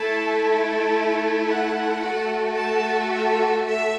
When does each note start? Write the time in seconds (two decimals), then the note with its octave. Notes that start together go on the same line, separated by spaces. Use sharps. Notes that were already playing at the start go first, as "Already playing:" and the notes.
Already playing: A3 E4 A4 A5
0.41 A5
1.49 F#5
2.03 A3 F#4 A4
2.57 A5
3.11 E5
3.65 E5